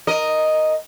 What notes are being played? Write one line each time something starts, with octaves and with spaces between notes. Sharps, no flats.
A#4 D#5